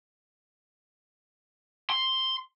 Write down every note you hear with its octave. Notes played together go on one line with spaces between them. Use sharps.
C6